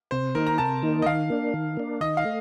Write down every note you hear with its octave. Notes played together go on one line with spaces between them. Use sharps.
C3 C5
D#3 A#3 D#4 A#4
A#5
C3 A5
D#3 A#3 D#4
D#5
D#3 F5
A#3 D4
D#3
A#3 D4
D#3 D#5
F5
A3